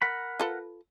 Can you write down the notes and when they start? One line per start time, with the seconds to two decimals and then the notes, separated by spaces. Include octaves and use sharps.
0.02 A#4 F#5 B5
0.40 F4 A4 B4